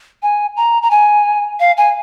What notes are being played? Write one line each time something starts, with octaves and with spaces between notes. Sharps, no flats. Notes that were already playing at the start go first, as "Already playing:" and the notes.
G#5
A#5
A#5
G#5
F5
G#5